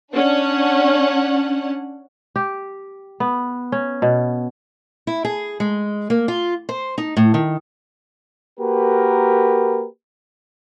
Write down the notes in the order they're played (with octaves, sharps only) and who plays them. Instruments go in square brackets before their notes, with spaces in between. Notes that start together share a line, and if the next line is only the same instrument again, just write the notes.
[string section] C#4 D4 F#5
[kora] G4
B3
C#4
B2
[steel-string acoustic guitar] E4
G#4
G#3
A#3
F4
C5
D#4
A2
D#3
[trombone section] A#3 F#4 G4 A#4 B4